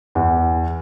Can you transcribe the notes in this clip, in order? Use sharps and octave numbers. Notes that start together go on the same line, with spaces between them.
E2